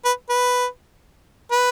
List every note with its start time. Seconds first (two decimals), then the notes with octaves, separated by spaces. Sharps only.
0.05 B4
0.30 B4
1.51 B4